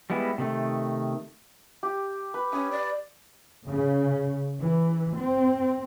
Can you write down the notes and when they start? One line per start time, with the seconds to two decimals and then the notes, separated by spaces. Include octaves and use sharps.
0.10 G3 G#3 B3 E4
0.38 C3 D#3 A3
1.83 G4
2.34 B4
2.53 C#4 D#6
2.72 D5
3.68 C#3
4.60 E3
5.16 C4